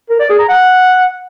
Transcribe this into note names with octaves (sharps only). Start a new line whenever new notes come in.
A#4
D5
G#4
A#5
F#5